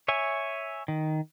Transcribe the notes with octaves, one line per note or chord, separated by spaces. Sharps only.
C#5 E5 G#5
D#3